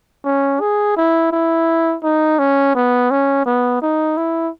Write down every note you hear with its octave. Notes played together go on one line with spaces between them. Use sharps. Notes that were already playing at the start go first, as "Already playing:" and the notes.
C#4
G#4
E4
E4
D#4
C#4
B3
C#4
B3
D#4
E4